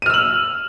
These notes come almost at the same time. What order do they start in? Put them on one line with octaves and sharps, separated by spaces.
D#7 F6 E6 F#7